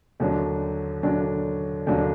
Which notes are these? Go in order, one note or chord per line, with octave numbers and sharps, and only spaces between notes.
D#2 D3 F#3 D4
D#2 D3 F#3 D4
D#2 D3 F#3 D4